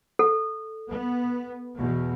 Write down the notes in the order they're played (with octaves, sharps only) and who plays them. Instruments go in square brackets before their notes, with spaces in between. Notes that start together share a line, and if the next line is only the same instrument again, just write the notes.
[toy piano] A4
[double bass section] B3
E2 B2